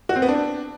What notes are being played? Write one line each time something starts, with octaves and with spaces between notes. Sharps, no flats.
F#4
C4
B3
D4